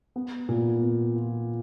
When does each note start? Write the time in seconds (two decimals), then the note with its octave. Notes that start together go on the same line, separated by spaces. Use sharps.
0.16 B3
0.49 A#2
0.82 B3
1.16 F4